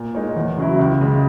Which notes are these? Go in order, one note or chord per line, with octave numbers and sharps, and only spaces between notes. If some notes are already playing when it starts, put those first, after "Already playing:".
Already playing: A#2
G#3 D#4 A#4 C#5
E2
C#3 F#3 C#4 E4
C#2
C#3 G#3